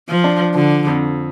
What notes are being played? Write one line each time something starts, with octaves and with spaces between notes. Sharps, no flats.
F3
D4
D3 F3
F2